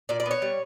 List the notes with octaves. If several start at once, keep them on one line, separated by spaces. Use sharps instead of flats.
A#2 D5
D5
B3
C#5
G3